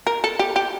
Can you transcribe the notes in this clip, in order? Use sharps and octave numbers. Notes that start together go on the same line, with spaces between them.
A#4
A4
G4
G4